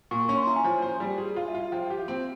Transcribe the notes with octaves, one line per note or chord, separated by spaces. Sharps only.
A#2 C#6
C#4 C#6
C6
E4 A#5
G#5
F3
C5
G3
G#4
F4 F5
E5
F4
F5
F3 G5
G4
C4